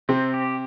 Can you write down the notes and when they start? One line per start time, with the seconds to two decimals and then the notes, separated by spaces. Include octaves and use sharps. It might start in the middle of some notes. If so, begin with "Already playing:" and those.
0.09 C3 C4
0.34 G4